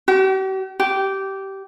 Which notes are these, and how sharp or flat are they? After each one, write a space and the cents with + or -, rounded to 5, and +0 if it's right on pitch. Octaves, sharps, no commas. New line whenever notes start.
G4 -45
G4 -15